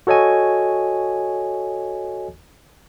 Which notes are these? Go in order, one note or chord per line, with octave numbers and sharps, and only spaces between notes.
F#4 A4 C#5 D#5 G#5